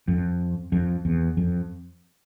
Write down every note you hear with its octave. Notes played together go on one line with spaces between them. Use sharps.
F2
F2
E2
F2